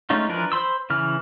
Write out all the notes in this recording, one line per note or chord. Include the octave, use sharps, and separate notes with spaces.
G#3 A3 C#4 D#4 F4
E3 F3 D4 A#4 B4
C5 B5 C6 E6
C#3 E3 F6